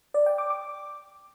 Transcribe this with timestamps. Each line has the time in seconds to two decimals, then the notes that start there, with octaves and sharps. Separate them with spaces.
0.14 D5
0.26 G5
0.38 D6
0.50 D6